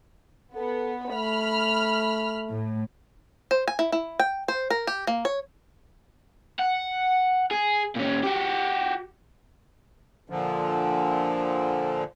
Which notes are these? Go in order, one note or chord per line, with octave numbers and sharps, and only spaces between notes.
B3 A4
A3 B5 F6
A2
C5
G#5
E4
E4
G5
C5
A#4
G4
A#3
C#5
F#5
G#4
A#2 C#4
F#4 G4
A#2 D3 F3